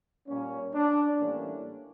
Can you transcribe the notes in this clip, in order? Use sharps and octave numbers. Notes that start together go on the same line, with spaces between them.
A#2 G3 A#3 C#4
D4
A2 E3 G3 A#3 C#4